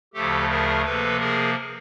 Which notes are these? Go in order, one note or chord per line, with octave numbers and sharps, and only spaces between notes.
D2 C#3 F3 A3 G4 A4
G#4 A#4
C3 F3 A#3 A4 B4
G#4 A#4